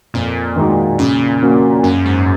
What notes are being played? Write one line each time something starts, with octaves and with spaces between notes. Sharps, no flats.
F2 A#2
D#3 G#3 D#4 F#4
A#2 C#3
F3 A#3 C#4 F#4
F#2 C#3
G#2